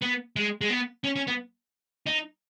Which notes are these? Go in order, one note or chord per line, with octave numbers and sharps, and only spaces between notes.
B3
G#3
G#3
B3
C#4
C#4
B3
D#4